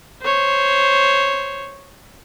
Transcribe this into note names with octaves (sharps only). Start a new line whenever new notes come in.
C5 C#5